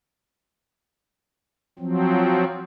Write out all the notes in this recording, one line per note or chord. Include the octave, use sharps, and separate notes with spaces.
F3 F#3 C4